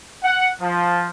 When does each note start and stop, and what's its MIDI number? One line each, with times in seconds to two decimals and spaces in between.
0.23 0.48 78
0.61 1.10 53